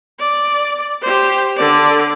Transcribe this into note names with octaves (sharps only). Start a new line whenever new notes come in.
D5
G4 C5
D3 D5